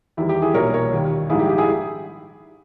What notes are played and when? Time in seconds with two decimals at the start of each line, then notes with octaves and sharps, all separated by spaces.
0.17 E2 D#3 G3 E4
0.29 G4
0.42 E4 G#4
0.54 B1 A#2 G3 A#4 C#5
0.73 A#4 C#5
0.92 D#2 D#3 G3
1.30 A#1 G#2 D#3 G3 E4 G#4
1.39 G4
1.49 G4
1.58 E4 G#4